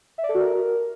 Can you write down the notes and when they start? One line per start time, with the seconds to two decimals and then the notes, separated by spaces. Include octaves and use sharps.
0.18 E5
0.24 D5
0.29 A4
0.35 F#4
0.40 A#4